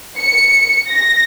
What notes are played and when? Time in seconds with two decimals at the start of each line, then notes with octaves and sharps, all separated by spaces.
0.20 C#7
0.89 A#6